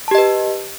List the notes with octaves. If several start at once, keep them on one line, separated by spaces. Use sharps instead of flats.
G4 B4 D#5 A5